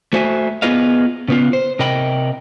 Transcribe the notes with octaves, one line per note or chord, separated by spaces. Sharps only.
A3 F#4 C5 E5 G5 G#5
B3 F4 G#4 B4 D#5 F5
C#3 B3 F4
C5
C3 A#4 D#5 G5 B5